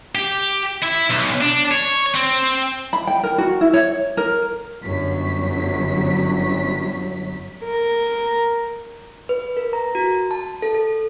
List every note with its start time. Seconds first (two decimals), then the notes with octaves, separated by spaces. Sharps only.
0.15 G4
0.82 E4
1.10 B1
1.41 D4
1.71 C#5
2.15 C4
2.93 B5
3.07 G5
3.23 A#4
3.38 F#4
3.61 E4
3.73 C#5
4.17 A#4
4.81 G1 F#2 F#3 B6
7.64 A#4
9.29 B4
9.57 A#4
9.73 A#5
9.95 F#4
10.31 A5
10.62 A4
10.75 A4